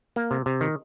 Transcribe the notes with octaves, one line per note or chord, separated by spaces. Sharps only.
A#3
C3
C3
D#3